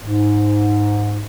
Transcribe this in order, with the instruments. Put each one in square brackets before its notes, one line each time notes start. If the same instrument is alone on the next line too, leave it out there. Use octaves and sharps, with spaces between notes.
[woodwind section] G#2